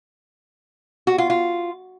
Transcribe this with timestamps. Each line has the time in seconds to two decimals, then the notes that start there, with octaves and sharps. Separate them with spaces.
1.07 F#4
1.18 F4
1.30 F4